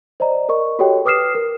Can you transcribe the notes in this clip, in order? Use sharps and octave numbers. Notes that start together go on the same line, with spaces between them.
C5 D5 D#5 A#5
A#4 D#5 C#6
F#4 G4 A4 C#5 D#5 G5
B4 D6 D#6 F6 C7 E7
A#4